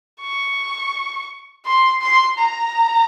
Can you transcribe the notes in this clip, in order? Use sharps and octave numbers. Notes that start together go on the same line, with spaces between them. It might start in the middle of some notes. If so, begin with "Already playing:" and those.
C#6
C6
C6
A#5